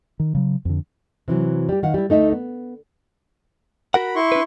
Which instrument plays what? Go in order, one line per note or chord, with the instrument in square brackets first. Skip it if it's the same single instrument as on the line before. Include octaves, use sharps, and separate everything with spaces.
[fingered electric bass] D#3
C#3 F#3
F2 D3
[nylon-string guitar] C3 E3 F#3
G3 G4
D#3 F5 F#5
G3 E4
D2 A3 D#4 D#5 E5
B3
[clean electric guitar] F#4 A#4 F#5 [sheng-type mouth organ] B5
[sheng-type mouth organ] E4 C6 C#6
[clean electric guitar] D4 B4